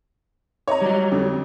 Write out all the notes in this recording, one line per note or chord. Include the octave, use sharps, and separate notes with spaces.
C#5 D#5 A#5
F#3 G3
F2 D3